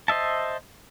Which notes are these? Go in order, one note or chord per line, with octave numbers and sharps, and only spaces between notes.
C5 D#5 E5 A5